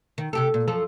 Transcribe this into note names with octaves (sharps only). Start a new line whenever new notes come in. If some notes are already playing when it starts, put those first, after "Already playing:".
D#3
C3 G4 A4
A#2
F#2 F3 A4